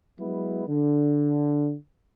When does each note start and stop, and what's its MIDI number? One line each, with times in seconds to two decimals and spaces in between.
0.18 0.63 54
0.18 0.63 56
0.18 0.63 59
0.18 0.63 64
0.67 1.74 50